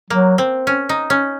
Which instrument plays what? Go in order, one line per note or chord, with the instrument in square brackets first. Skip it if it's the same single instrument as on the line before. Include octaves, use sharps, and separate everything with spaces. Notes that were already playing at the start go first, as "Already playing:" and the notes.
[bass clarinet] F#3 [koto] A#3
[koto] C4
C#4
D#4
C#4